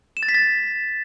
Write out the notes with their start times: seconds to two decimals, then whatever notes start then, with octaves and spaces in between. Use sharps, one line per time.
0.17 E7
0.23 A6
0.29 B6
0.34 A6